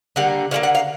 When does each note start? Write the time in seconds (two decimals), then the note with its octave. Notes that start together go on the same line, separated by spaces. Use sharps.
0.16 D3 G3 A#3 F#5
0.51 D3 G3 A#3 F5
0.63 F#5
0.75 F5